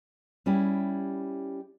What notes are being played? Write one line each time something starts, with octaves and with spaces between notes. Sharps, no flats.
G3 C#4 E4 G4